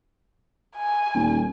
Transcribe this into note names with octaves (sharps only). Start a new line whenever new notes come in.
G#5
D#1